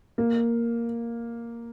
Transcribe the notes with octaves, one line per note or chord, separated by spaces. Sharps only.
A#3